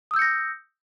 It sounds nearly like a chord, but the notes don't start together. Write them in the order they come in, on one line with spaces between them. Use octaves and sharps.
D#6 E6 G6 C#7 A#6